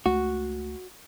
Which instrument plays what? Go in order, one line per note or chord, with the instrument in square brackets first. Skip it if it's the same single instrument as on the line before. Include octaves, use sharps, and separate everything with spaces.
[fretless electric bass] C#2 A3 [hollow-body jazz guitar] F#4